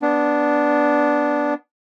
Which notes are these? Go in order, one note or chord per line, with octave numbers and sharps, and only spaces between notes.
B3 D4